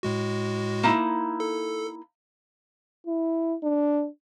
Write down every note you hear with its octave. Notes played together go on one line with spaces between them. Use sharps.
A2 G#3 F#4
A#3 D#4 E4
A4
E4
D4